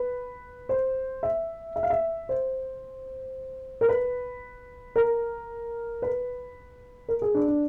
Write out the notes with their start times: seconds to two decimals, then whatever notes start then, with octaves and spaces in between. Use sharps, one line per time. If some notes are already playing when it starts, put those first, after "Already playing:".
Already playing: B4
0.69 C5
1.23 E5
1.76 E5
1.83 F5
1.90 E5
2.29 C5
3.81 A#4
3.89 B4
4.96 A#4
6.02 B4
7.08 A#4
7.22 G#4
7.35 D4
7.48 D4